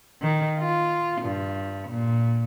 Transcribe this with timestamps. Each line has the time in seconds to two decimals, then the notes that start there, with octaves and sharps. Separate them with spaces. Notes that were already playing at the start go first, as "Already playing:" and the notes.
0.22 D#3
0.58 F4
1.21 G2
1.90 A#2